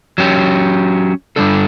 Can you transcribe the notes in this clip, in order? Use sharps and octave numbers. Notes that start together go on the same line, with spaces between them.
F#3 C#4 G4
G2 D3 G3 D4 A4